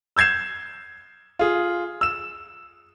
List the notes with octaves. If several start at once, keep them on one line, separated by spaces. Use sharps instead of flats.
E6 G6 G#6 C7 E7
F4 G#4
E6 E7